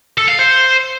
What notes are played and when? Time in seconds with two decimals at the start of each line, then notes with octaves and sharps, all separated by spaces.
0.18 A4
0.28 F5
0.39 C5